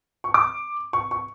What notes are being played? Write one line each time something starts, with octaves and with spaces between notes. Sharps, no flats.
C#6
D6
C#6
C#6